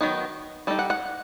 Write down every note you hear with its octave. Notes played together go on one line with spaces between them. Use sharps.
D#3 F#3 B3 D#4
G3 D#4 A4
F#5
F#5